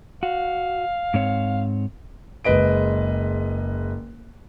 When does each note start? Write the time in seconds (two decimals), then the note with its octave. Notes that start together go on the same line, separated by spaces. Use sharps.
0.23 F#4 F5
1.14 G#2 C4 C#5
2.45 F#1 G#3 B4 D#5 D7